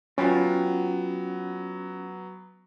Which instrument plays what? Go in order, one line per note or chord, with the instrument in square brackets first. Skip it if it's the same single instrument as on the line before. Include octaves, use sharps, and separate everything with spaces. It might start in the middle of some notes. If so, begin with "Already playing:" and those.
[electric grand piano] F#3 B3 [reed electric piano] C#4 [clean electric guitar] F4 G5 B5